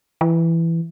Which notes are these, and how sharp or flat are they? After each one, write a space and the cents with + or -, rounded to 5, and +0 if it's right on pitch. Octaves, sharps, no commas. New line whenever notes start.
E3 +10